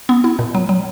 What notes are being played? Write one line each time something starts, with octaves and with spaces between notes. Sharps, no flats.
B3
E4
A#2
F#3
F#3